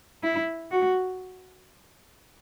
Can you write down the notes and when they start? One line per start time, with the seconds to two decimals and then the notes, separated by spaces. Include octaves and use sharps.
0.23 E4
0.71 F#4